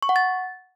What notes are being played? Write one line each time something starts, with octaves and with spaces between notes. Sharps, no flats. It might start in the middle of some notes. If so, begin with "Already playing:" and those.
C#6
F#5
A6